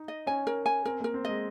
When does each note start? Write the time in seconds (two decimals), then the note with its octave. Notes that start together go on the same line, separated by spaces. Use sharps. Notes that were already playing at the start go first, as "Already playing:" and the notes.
Already playing: D#4
0.08 D#5
0.27 C#4 G#5
0.47 A#4
0.66 G#5
0.85 C4 A#4
1.01 A#3 A#4
1.14 C4
1.25 G#3 D#5